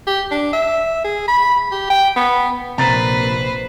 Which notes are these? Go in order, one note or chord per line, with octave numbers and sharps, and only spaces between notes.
G4
D4
E5
G#4
B5
G4
G5
B3
A#1 C3 B4 C5 A#5 A6 B6